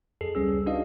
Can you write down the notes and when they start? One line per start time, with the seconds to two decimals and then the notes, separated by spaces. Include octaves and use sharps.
0.21 F2 G#4 A4 C7
0.35 C#2 G3 C#4 G#4 E6
0.66 D4 D#4 F#4 B4 D#5 F5